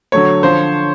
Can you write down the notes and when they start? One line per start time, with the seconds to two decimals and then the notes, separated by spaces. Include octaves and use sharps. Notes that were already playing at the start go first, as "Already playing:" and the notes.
0.12 D3 F#3 A3 C#5
0.43 D3 F3 C5